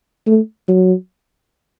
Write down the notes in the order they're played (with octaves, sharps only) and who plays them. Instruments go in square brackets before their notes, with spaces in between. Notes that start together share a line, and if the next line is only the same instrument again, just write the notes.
[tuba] A3
F#3